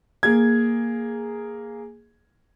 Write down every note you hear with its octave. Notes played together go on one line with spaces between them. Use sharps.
A#3 G#4 G#6